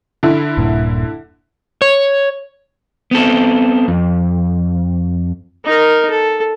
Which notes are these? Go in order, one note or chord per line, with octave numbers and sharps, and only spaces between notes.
D3 E4
D#1 G2 A#2
C#5
B3 C4 A4
F2
D#4 A#4
A4